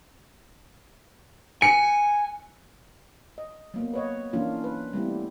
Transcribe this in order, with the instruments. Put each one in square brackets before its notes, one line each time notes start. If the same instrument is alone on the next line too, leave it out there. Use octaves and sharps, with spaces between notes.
[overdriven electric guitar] G#5 [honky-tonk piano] C#7
[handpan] D#5
F#3 A#3 B3
B4 C#5 D#5
E3 F#3 A#3 C#4 D4 F4
B4
G3 A3 B3 C4 E4